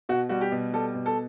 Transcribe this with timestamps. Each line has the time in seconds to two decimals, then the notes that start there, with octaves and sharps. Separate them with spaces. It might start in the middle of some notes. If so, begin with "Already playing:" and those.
0.09 B2 F#4
0.29 G3 F#4
0.41 G4
0.52 B2
0.73 G3 A4
0.95 B2
1.06 A4